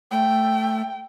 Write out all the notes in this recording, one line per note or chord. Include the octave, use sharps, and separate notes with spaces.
A3 G5